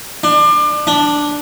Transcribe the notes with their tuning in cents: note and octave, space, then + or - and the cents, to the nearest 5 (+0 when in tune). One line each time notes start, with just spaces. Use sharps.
D4 +30
D4 +0